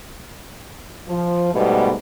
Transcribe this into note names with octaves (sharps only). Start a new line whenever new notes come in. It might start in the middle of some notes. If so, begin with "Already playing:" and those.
F3
G#2 B2 G3 A3 B3